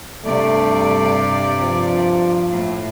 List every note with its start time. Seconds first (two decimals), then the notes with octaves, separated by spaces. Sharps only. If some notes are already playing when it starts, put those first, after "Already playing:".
0.25 G2 C3 A3 D5
1.60 F3
2.51 A2